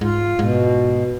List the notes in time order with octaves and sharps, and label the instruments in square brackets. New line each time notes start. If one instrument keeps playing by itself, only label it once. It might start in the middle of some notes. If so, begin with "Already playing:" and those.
[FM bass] G#2 [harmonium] F4
[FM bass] G#2 [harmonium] B2